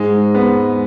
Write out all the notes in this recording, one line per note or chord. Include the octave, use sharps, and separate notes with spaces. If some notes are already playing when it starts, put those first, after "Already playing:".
Already playing: G#2 G#3
B3